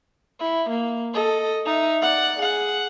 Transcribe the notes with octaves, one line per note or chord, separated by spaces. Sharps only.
E4
A#3
A4 D#5
D#4 E5
D5 F#5
G#4 F#5